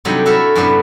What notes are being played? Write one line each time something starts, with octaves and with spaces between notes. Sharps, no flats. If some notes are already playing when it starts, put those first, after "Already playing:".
C3 F#3 G3 D4 D#4 A4
E4 F#4 A4 A#4 C#5 E5
F#2 A2 C3 B3 D4